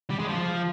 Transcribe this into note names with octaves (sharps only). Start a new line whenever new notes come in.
G3
G#3
F3